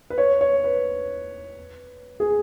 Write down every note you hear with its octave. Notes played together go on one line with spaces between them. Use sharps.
B4
C#5
C#5
B4
G#4